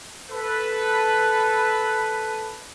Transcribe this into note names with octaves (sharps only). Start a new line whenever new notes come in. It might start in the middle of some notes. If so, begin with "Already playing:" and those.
A4 B4